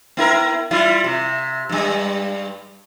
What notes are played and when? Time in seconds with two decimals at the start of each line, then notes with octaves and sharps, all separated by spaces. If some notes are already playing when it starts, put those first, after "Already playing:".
0.17 B3 E4 A#4
0.71 G3 E4 F4
1.04 C3
1.69 G2 G3